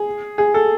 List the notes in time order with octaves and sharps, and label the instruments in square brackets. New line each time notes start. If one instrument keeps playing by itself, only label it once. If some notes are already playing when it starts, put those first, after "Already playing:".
Already playing: [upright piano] G#4
G#4
A4